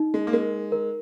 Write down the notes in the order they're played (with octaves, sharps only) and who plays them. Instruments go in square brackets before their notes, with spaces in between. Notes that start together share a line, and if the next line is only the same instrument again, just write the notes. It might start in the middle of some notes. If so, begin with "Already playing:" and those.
Already playing: [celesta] D#4
[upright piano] G#3
A#3
[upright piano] G#3 [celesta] A#4
[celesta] A#4